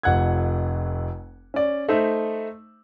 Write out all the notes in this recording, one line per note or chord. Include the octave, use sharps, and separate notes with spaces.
F1 F2 F#5 F#6 G#6
C#4 D5
A3 D#4 C5 E5 E6